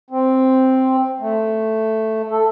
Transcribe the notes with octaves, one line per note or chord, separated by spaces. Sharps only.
C4
A3
A4